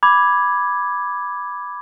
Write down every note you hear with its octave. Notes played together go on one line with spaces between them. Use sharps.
B5 D6 G#6